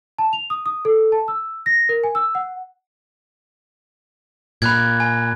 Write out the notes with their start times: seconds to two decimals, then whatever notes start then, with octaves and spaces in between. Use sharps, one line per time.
0.18 A5
0.33 F7
0.50 D#6
0.66 D#6
0.85 A4
1.12 A5
1.28 E6
1.66 A#6
1.89 A#4
2.04 G#5
2.15 E6
2.35 F#5
4.62 A#2 B5 F#6 G#6
5.00 G#5